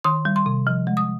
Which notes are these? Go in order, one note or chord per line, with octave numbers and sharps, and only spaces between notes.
D#3 C6
G3
C6
C3
F3
G#3
D#6